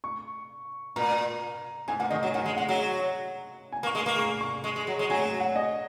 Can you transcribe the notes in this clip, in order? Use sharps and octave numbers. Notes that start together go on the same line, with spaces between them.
C#6
A#2 A#5
G#2 G#5
A#2 F#5
D#3 D#5
F#3
D#3 F#5
G#3
G#3 F#5
F#3
G#5
A#3
C#6
G#3
A#3 C#6
C#6
C#6
G#3
G#3
F#3
G#3
F#3 G#5
F#5
D#5